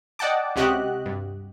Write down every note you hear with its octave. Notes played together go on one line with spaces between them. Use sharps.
D5 D#5 F#5 G5 A5 D6
C#2 C3 F#4 G4 D#5 F#6
G2